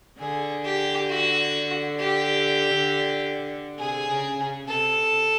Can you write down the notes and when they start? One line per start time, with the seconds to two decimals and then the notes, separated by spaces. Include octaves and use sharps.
0.19 D3 G#4
0.65 G4
1.09 F#4
1.99 G4
3.79 C3 G#4
4.09 C#3
4.39 C#3
4.68 C3 A4